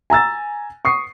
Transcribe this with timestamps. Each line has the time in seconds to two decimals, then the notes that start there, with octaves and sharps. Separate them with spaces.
0.10 G#5 A#5 E6 A6
0.85 C#6 D#6 C7